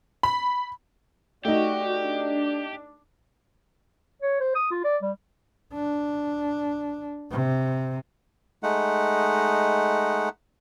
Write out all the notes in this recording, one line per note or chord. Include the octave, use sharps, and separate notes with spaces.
B5
A3 D#4 F#4 G4 D5
D4
C#5
C5
D#6
F4
D5
G3
D4
C3
G#3 A3 D#4 F#5